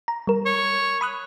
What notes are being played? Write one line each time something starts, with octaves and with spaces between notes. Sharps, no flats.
A#5
G3 A#4
C#5
B5 D#6 F#6